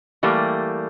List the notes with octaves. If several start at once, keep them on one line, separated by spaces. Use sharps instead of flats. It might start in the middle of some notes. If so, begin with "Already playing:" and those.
E3 G3 A3 A#3